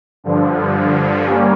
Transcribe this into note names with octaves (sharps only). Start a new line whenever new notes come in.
G2 D3 F3
G3 A#3 C#4